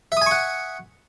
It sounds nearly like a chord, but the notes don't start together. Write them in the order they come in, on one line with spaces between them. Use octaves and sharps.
E5 D#6 G#5 C#6 F#5